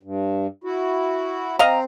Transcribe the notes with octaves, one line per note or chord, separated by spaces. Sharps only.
G2
E4 F#4
C4 C5 D#5 F5 A#5